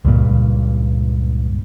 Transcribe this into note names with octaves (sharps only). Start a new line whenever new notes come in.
C#2 G2 A#2